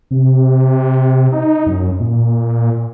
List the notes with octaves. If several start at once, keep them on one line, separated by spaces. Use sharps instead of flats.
C3
D#4
F#2
A#2